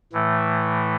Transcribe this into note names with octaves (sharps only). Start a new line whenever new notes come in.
A2 E3 A3